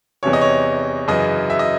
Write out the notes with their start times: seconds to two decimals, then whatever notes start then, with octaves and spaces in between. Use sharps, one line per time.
0.23 E2 C3 E3 C#5
0.33 D#5
0.41 C#5
1.08 F#2 C#3 E3 D#5
1.50 E5
1.59 D#5